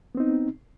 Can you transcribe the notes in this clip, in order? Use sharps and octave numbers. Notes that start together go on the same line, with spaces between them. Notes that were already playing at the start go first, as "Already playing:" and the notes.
B3 C4 D#4